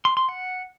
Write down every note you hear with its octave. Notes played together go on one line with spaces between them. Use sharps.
C6
C6
F#5